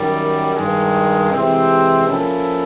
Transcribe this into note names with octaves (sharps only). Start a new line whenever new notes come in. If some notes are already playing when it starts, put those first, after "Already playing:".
Already playing: F#2 D#3 G3
G2 D#3 G#3
C3 E3 G#3 C4
F3 A#3 C#4 E4 A4